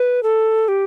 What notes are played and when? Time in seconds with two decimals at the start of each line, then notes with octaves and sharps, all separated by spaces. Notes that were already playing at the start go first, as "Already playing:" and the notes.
Already playing: B4
0.23 A4
0.68 G4